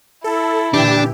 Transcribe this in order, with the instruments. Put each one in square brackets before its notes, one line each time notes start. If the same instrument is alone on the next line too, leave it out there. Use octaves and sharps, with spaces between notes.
[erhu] E4 [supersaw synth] A4
[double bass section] A#2 D3 E3 [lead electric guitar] D4 [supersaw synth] G4